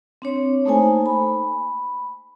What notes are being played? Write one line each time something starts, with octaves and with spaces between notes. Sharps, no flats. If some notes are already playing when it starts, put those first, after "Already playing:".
C4 D4 C#5
A3 A#3 D#4 A4 C5 G#5
B5